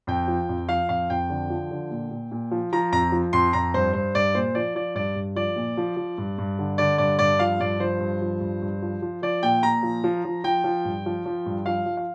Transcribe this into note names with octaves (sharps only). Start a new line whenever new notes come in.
F2 G5
F3
F2
F3 F5
F2 F5
F2 G5
D3
F3
D3
A#2
A#2
A#2
F3
F3 A#5
F2 A#5
F3
F2 C6
F2 A#5
G2 C5
G2 C5
G2 D5
A#2 C5
F3 D5
F3 D5
G2 D5
G2
F3 D5
A#2
F3
F3
G2
G2
D3
D3 D5
G2 D5
G2 D5
F3 F5
G2 D5
F3 C5
G2
F3
G2
G2
F3
F3
F3 D5
A#2 G5
A#2 A#5
F3
F3
F3
F3 G5
F3
G2
F3
F3
G2
F3 F5
F3
F5